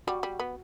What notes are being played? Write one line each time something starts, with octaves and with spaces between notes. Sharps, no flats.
G3 F#4
G3
B3